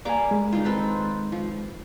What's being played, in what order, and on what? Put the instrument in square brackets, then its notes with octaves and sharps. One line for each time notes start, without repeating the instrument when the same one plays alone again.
[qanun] G3 A#3 D6 [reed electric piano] D5 G#5
[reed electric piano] G#3
[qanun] D#3 F4
C4 A4 B4
F3